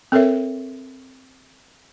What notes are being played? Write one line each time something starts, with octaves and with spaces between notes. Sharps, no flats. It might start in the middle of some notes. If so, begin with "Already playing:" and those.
C4 A4 A#4 C#5 E5